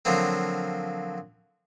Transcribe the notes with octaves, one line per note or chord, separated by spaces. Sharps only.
D3 F3 F#3 A#3 C4